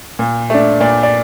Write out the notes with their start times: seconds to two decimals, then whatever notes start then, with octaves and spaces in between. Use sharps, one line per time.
0.19 A#2
0.50 A3 D4
0.80 A#2 D5
1.03 D5